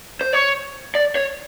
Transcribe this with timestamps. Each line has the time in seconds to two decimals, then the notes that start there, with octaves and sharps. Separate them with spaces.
0.21 C5
0.33 C#5
0.95 D5
1.15 C#5